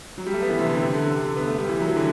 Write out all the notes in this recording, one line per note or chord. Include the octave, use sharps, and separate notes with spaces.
F#3
G3
A3
B3
E3
C3
D3
C3
D3
D3
C3
D3
B3
A3
G3
E3
F#3
E3
D3